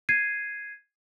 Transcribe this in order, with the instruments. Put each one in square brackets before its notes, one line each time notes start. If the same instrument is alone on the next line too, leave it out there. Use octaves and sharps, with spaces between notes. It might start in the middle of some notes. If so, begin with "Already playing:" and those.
[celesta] G#6 C7 D#7